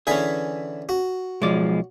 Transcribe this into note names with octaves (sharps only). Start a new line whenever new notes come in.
D3 E3 C#4 G#4 B4
F#4
B1 F3 G#3 D5